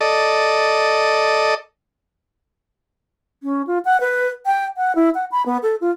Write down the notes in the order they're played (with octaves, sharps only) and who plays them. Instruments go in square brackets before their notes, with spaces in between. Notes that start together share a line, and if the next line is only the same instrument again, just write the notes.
[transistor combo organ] A4 D5 D#5
[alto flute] C#4
F4
F#5
B4
G5
F#5
E4
F#5
B5
B3
A4
F4